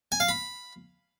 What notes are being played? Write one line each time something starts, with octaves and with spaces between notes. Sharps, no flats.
G#5
F5
B5